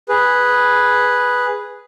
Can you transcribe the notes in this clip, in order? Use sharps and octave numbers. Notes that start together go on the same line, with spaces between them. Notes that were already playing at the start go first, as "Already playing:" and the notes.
G#4 B4